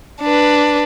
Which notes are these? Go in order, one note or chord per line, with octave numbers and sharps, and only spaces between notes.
D4 B4